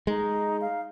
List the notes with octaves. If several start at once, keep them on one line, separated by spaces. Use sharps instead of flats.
G#3 D#4
F5